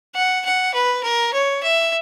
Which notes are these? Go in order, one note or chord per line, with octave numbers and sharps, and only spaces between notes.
F#5
F#5
B4
A#4
C#5
E5